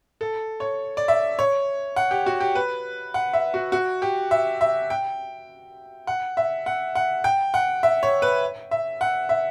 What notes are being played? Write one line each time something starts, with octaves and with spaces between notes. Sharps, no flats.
A4
C#5
D5
E5
C#5
F#5
G4
F#4
G4
B4
F#5
E5
F#4
F#4
G4
E5
E5
G5
F#5
E5
F#5
F#5
G5
F#5
E5
C#5
B4
E5
F#5
E5